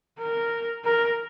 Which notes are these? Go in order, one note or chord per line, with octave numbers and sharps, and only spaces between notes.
A#4
A#4